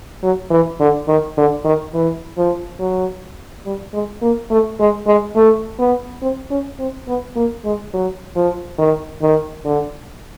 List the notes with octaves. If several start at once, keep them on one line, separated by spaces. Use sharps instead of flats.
F#3
E3
D3
D#3
D3
D#3
E3
F3
F#3
G3
G#3
A#3
A3
G#3
G#3
A3
B3
C4
C#4
C4
B3
A#3
G#3
F#3
F3
D#3
D#3
D3